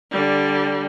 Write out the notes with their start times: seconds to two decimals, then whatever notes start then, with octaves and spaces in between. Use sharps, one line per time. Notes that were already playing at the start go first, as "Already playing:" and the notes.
0.11 D3 G3